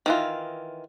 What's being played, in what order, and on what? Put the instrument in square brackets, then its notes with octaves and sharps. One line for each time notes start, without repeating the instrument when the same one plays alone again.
[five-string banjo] D#3 E3 F4